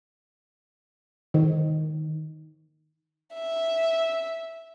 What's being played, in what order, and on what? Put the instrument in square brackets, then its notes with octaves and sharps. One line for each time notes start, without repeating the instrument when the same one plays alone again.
[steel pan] D#3
[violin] E5